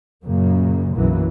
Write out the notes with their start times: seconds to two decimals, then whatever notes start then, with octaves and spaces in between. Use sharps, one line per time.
0.24 F#2 A#2 C#3 A#3
0.95 B1 F#2 C#3 E3 F#3 A#3